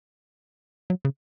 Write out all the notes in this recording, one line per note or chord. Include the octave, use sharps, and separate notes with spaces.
F#3
C#3